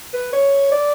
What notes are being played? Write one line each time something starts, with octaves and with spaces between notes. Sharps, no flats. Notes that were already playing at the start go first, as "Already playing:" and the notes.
B4
C#5
D5